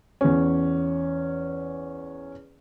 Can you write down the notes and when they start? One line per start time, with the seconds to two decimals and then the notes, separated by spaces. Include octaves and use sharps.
0.21 E2 C#4